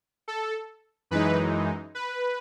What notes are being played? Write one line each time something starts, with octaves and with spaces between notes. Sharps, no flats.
A4
F#2 E3 G#3 D#4 B4
B4